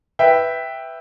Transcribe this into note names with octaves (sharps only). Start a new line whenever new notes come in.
B4 E5 G5